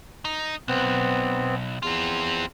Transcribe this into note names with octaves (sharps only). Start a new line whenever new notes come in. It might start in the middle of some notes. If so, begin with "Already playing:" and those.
D#4
B1 B3 C4
E2 C4 F4